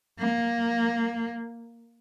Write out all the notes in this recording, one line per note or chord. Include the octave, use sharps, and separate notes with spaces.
A#3